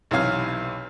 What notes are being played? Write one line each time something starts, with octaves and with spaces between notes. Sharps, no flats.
B1 C3 E3 C#5 F5 F6